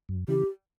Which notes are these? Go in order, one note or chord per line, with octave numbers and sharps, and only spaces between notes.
F#2
C#3 E3 G4